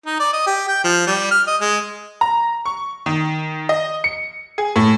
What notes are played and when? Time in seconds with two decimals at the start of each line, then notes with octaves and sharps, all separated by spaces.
0.06 D#4
0.20 D5
0.33 D#5
0.47 G4
0.69 G5
0.84 F3
1.07 G3
1.31 F6
1.47 D#5
1.61 G#3
2.21 A#5
2.66 C#6
3.06 D#3
3.69 D#5
4.04 C#7
4.58 G#4
4.76 A2